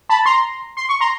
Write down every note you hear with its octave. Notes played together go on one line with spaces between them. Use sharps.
A5 B5
A#5 C6
C6
C#6
A#5 C6